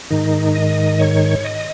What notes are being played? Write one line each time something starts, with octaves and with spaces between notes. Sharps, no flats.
G#2 D#3 D#4
D#5
C#5
D#5